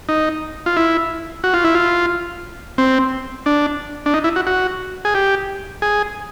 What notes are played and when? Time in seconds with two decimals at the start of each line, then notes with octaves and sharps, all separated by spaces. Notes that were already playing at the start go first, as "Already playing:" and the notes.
0.09 D#4
0.66 F4
0.77 E4
1.44 F#4
1.54 F4
1.64 E4
1.75 F4
2.78 C4
3.46 D4
4.06 D4
4.14 D#4
4.24 E4
4.36 F#4
4.47 F#4
5.05 G#4
5.15 G4
5.82 G#4